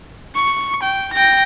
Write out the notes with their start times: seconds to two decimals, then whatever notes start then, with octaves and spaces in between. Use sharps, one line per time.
0.35 C#6
0.83 G5
1.13 G5 A#6